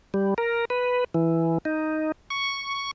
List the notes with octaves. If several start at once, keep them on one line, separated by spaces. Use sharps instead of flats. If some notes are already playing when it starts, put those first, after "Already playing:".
G3
A#4
B4
E3
D#4
C#6